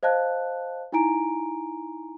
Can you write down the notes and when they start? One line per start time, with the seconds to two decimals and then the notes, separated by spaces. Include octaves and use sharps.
0.03 C5 D#5 F5 A5 F#6
0.92 D#4 E4 G#5 A#5 D7